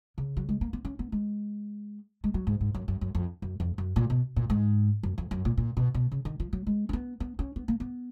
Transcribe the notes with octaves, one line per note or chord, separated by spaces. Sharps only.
C#3
F#3
G#3
A#3
B3
C#4
B3
G#3
G#3
F#3
G#2
G#2
F#2
F#2
F#2
F2
F#2
F2
F#2
A#2
B2
A#2
G#2
F#2
F2
F#2
A#2
A#2
B2
B2
C#3
D#3
F3
F#3
G#3
C#4
B3
B3
C#4
B3
A#3
B3